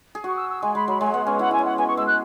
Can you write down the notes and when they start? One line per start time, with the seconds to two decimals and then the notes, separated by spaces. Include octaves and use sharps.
0.15 G#4
0.24 F#4 C#6
0.36 E6
0.50 E6
0.62 G#3 G#5
0.75 G#3 B5
0.88 F#3 B5
1.00 G#3 G#5
1.13 B3 F#5
1.25 C#4 G#5
1.39 E4 F#5
1.51 E4 G#5
1.59 C#4
1.65 F#5
1.78 B3 G#5
1.88 C#6
1.97 G#3 E6
2.07 F#6